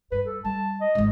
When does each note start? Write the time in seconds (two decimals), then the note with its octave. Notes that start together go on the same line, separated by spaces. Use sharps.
0.12 G2 B4
0.26 A4
0.45 G3 A5
0.81 D#5
0.95 G#1 G#2